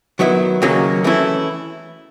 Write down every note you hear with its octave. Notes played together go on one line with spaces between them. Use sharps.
D#3 F#3 B3 E4
D#2 C#3 F#3 A#3 C#4
E3 A3 C#4 E4